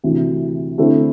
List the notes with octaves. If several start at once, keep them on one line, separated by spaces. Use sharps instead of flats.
D2 C3 E3
D3 A3 C4 E4